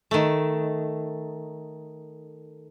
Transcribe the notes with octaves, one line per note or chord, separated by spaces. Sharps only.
D#3 A3